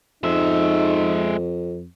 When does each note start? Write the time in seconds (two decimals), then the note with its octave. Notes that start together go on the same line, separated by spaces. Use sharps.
0.23 F2 G#3 D#4 E5